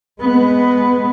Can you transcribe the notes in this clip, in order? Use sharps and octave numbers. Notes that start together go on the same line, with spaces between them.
G#3 B3